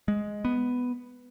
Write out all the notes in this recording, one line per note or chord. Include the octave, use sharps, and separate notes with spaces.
G#3
B3